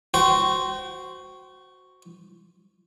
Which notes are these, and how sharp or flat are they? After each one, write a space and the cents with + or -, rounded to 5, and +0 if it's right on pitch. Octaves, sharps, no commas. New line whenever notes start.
F#4 +0 C5 -5 G5 -35